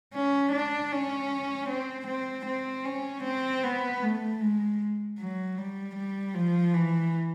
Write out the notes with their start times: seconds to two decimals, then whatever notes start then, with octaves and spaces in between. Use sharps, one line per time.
0.14 C#4
0.53 D4
0.92 C#4
1.70 C4
2.07 C4
2.46 C4
2.85 C#4
3.25 C4
3.63 B3
4.02 A3
4.41 G#3
5.19 F#3
5.57 G3
5.96 G3
6.34 F3
6.74 E3